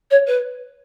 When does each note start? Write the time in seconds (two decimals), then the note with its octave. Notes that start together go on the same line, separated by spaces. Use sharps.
0.11 C#5
0.27 B4